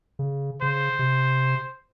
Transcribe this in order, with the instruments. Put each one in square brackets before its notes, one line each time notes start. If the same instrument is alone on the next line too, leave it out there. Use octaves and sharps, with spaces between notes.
[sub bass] C#3
[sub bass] C#3 [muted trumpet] C5
[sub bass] C3